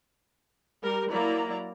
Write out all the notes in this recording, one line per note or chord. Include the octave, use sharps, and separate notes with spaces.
G3 A#4
F#3 A#3 E4 D5 A#5